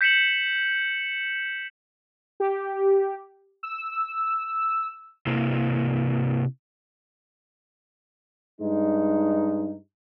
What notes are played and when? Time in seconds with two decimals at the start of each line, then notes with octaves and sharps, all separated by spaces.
0.01 G6 B6 C#7 E7 F#7
2.40 G4
3.63 E6
5.27 C3 A#3 E4
8.60 G2 G#3 D#4